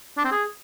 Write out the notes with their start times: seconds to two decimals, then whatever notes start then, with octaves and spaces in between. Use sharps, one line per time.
0.18 D4
0.24 C4
0.31 G#4